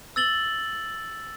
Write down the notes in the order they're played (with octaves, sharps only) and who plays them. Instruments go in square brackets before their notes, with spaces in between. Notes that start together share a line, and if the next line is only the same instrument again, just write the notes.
[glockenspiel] E6 A6 F#7 G7